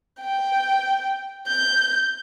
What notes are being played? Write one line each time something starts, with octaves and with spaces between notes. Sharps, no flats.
G5
G6